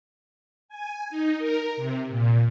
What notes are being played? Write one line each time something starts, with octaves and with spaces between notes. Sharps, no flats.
G#5
D#4
A#4
C3
A#2